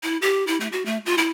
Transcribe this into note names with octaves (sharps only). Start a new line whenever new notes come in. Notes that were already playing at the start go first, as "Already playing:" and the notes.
E4
G4
E4
A3
F#4
A3
F4
E4